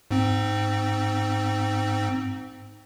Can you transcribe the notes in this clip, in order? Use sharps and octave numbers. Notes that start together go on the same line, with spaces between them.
G#2 C4